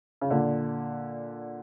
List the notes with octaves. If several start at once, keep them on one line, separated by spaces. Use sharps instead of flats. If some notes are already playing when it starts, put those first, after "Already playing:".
C#3
A#2 D3